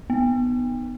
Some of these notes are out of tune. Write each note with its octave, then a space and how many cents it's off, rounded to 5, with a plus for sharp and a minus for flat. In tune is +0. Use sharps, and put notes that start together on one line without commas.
B3 +5